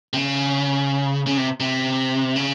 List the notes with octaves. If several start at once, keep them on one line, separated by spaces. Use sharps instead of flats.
C3
C#3
C#3
C3
C3
C#3